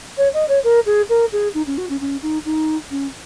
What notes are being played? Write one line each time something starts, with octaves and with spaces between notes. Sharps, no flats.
C#5
D#5
C#5
A#4
G#4
A#4
G#4
D#4
C#4
F#4
C#4
C#4
D#4
D#4
C#4